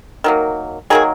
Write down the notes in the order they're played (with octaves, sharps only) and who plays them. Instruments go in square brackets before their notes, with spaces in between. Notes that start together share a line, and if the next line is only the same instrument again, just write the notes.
[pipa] D#3 F#3 A#3
D#3 F#3 A#3 G#4